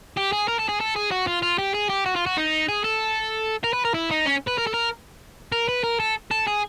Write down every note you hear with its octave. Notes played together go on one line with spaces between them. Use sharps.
G4
G#4
A#4
A4
G#4
A4
G#4
F#4
F4
F4
G4
G#4
G4
F#4
F4
F#4
D#4
G#4
A4
A#4
B4
A#4
E4
D#4
C#4
B4
A#4
A4
A#4
A#4
B4
A#4
A4
A4
G#4